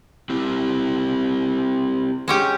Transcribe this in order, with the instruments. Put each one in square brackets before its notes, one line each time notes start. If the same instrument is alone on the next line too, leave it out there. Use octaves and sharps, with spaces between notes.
[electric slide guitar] C4 E4 G4
[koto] G#3 C#4 G4